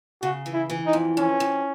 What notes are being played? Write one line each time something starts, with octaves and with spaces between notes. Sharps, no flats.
C#3 F#4
E3
E4
E3
D#4
F2
F2 C#4
F2